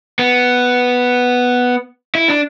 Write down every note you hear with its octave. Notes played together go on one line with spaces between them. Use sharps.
B3
E4
D4